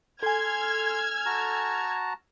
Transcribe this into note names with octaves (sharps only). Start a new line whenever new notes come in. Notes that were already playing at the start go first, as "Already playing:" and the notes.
A4 G#5 C6 E6 F6 G#6
F#4 A5 A#5